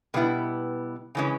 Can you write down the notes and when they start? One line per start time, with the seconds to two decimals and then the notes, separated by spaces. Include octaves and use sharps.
0.14 B2 G3 B3 E4
1.15 C#3 E3 G#3 C#4